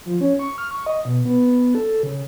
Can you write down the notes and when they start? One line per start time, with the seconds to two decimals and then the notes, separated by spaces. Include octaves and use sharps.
0.05 F3
0.21 C#4
0.39 C#6
0.58 F6
0.71 C#6
0.86 D#5
1.05 B2
1.25 B3
1.75 A4
2.03 C#3